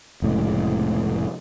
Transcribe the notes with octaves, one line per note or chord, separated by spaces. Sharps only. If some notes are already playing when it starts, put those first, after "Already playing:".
F1 A2 C#3 G#3